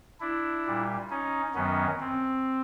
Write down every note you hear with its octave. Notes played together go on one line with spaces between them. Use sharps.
D4 E4
A#2 G3
C#4 D#4
F#2 D#3 F#3 B3 C#4
C4